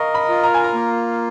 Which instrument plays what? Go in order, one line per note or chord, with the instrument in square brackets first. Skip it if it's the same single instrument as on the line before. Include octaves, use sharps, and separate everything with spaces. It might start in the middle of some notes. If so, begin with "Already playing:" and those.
Already playing: [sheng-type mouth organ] A#4 D#5 [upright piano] F5 C#6
[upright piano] B5
[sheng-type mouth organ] F4
[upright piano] A#5
G#5
A#5
[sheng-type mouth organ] A#3